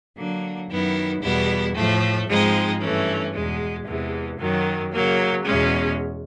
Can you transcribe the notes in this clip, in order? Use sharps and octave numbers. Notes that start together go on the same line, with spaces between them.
D3 F#3 A#3
F#2 D#3 F#3 B3 E4
E2 B2 G3 B3 E4
A2 F3 A3
G#2 F3 G#3 C4 D#4
G2 E3 A3 C#4
E2 B2 G#3
E2 C3 E3 G#3
F#2 D#3 F#3
C#3 F#3 A#3
E2 B2 G#3 C#4